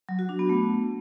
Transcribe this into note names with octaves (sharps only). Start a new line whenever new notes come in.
F#3
F#4
D4
B3
A3